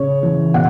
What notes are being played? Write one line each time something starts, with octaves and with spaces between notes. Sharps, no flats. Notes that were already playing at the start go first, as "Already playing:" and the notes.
Already playing: C#3 C#5
E3
B2 F#5